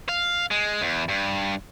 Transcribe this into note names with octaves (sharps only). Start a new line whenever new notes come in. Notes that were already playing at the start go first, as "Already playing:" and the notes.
F5
G#3
E2
G2